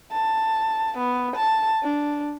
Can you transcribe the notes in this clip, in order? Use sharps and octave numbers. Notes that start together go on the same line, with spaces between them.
A5
B3
A5
D4